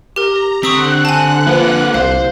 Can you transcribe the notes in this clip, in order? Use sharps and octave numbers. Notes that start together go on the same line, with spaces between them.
G4 A#4 A#5
D3 C4 F#5 C#6 D#6 F#6 B6
G#5 A5
F3 A#3 B4
C2 C5 F5